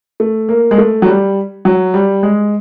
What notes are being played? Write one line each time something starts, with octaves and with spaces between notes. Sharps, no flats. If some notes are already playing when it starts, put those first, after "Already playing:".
A3
A#3
G#3
A3
F#3
G3
F#3
G3
G#3